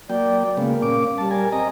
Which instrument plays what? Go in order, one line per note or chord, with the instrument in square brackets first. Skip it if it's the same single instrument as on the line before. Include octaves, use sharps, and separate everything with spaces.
[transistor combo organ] F#3 A#3 G5 [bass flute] D5
[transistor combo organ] C#3 G#3 B3 [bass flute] A#3
[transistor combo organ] A#2 C#4 D6
[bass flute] G3 [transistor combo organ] A5
[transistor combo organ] A#4 G#5
[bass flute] C4 [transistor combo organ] D#5 A#5